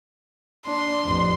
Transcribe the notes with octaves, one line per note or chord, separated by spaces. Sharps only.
D4 C6
A1 F2